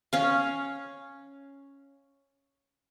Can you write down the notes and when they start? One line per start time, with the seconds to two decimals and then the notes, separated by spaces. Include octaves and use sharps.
0.13 C#4 F5